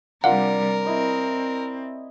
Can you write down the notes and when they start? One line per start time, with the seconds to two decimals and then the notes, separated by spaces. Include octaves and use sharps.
0.24 C3 G3 D4 F4 A#4 F5 F#5
0.85 C4 E4 D#5 B5